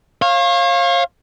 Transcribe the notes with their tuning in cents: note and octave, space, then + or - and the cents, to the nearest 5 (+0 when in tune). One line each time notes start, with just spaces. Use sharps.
C#5 -40 F5 +0